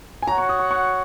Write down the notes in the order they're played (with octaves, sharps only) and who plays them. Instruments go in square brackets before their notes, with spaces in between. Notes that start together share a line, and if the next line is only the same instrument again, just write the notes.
[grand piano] G#5
[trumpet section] F#4 C#5 F#5 [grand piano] A#5
[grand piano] C#6
D#6
C#6
C#6